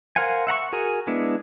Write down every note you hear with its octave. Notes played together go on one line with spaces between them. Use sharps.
A#4 C5 F5 F#5 G#5
E5 F#5 A#5 C#6
F#4 G#4 A#4 G#5
G#3 B3 D4 E4